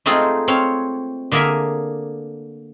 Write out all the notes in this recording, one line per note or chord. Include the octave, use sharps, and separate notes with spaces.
G#3 A3 C4 D#4 F4 G#4
C4 C#5 F5
D3 A#3 G#4 A#4 E5 G#5